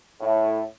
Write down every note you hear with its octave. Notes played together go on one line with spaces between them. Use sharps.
A2